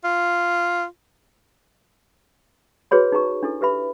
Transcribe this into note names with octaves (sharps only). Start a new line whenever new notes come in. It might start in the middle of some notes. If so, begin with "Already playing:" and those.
F4
F#4 G#4 B4 C#5 B5
D#4 G#4 A#5 C#6
D4 E4 A4
G4 B4 E5 B5